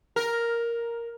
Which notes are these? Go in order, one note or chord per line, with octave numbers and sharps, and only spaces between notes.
A#4